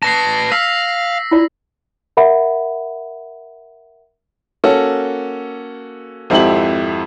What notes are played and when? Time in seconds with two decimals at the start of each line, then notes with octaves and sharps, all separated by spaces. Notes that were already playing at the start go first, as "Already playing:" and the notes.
0.03 B4 A5 A#6 C7
0.52 F5 E6 B6
1.31 E4 F4 D5
2.17 A#4 E5 F#5 B5
4.64 A#3 C#4 F#4 A4
6.30 G#1 F2 E4 G4 F#7